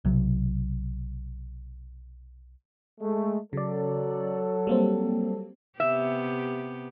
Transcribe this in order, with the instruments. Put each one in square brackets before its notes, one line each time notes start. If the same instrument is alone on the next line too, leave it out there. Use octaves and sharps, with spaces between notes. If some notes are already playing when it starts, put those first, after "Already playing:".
[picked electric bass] B1 C3 F#3
[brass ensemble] G#3 A3
[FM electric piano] C#3 D5 [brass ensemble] F#3 A4
[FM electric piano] G3 A#3 C4
[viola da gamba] C3 B3 G4 [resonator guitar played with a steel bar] E5